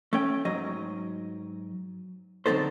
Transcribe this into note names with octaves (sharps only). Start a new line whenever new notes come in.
A3 C#4 G5
G#2 F#3 D#5
D3 F#3 C4 D#4 A4 C5